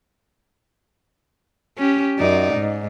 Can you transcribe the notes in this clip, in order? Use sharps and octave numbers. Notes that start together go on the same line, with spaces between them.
C#4 G4
F#2 D#4 D5
G#2